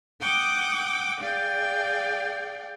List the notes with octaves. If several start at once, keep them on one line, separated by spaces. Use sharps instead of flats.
F#5 G5 D6 D#6 F#6 G6
G#4 D5 F5 G5